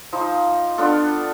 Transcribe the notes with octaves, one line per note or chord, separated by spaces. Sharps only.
F3 D#4 C5
B3 D4 F4 A4